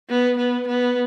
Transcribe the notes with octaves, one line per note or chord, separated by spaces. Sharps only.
B3
B3
B3